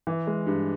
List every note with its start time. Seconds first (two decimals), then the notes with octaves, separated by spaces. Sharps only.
0.07 E3
0.27 G#3
0.46 G2